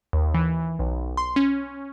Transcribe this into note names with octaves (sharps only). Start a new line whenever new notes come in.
D#2
E3
B1
C6
C#4